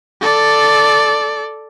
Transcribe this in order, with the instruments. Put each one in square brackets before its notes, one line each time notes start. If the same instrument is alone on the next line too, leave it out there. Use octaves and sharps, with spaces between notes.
[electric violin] A4 D5